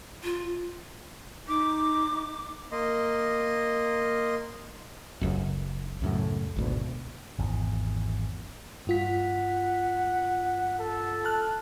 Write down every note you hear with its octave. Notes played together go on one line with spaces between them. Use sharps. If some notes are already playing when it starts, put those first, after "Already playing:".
F4
D#4 D6
A#3 D#5 C6
F#1 C#2 F#2
C#2 F#2 A2
G#1 D2 B2
G#1 E2
G2 F4 F#5 B6
A4
A5 F6 F#6